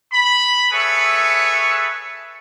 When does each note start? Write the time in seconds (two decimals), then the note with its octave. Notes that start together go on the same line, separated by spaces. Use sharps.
0.13 B5
0.72 G#4 A4 B4 C#5 E5